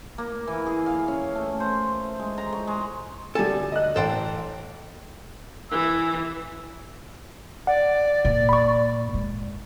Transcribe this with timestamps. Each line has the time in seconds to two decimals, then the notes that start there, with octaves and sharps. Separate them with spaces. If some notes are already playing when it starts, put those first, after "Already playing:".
0.18 A#3
0.48 E3
0.66 G#4
0.86 F5
1.08 C#4
1.35 A3
1.60 C5
2.20 G#3
2.38 A#5
2.52 C#6
2.67 G#3
3.35 D2 G3 A4 G#5
3.72 D#5 F#6
3.96 A1 A4 C5 G5
5.71 E3 E6
7.67 D5 F#5
8.25 A#2
8.49 B5 C#6
9.14 G#3